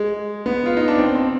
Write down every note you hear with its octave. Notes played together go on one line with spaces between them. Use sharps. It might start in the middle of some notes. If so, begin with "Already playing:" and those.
Already playing: G#3
B3
F4
D#4
D4
C4
C4